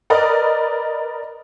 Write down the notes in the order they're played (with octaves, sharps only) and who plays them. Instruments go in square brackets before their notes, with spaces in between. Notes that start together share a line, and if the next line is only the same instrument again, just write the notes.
[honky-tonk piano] A#4 B4 D5 D#5